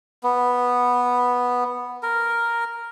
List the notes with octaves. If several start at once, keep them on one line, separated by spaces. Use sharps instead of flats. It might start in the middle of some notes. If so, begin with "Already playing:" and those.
B3
A#4